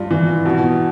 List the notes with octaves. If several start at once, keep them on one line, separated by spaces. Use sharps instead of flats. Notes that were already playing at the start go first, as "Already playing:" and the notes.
Already playing: G2 F4
E3
B2